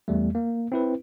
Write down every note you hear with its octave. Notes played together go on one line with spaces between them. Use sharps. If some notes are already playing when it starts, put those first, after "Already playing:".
E2 G3 A3
A#3
C4 E4 B4